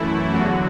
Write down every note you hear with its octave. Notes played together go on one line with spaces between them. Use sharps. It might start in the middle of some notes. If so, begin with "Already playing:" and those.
Already playing: F#2 E3 A3 E4
E2 D3 F#3 F#4